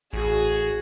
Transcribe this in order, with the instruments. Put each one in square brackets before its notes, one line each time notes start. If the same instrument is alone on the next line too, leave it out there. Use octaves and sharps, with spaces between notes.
[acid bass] A1 [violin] F#4 G#4